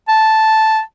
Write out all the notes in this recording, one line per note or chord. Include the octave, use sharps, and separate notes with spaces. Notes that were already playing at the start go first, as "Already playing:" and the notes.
A5